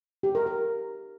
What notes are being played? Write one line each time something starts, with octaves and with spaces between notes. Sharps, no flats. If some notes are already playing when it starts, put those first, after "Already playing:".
G4
A#4
A#4